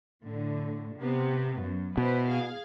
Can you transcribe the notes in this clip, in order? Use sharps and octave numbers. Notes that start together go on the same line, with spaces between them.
A2 D3
C3 B3
F#2
B2 E4 B4 C5
G#4 F5